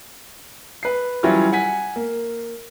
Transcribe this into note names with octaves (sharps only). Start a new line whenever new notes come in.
B4 C7
E3 F#3 G3 C#4 E4 F4
F#5 G#5 B6
A#3